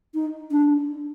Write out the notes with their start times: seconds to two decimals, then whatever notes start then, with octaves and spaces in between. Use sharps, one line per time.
0.14 D#4
0.51 D4